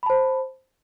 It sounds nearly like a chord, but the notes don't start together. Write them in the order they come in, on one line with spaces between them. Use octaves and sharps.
B5 A5 C5